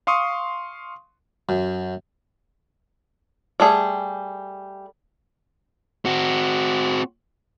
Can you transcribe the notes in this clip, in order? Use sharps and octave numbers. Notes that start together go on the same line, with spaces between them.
F5 C6 C#6 D#6
F#2
G3 A3 G#4
C4 F#4